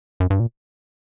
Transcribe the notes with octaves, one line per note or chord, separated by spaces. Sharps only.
F#2
G2
A#2